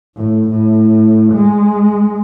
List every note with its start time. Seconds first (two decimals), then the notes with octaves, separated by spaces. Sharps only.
0.17 A2
0.50 A2
1.33 G#3